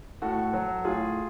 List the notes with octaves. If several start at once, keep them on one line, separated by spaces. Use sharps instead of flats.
A2 F#4 A4
F#3
A2 F4 G#4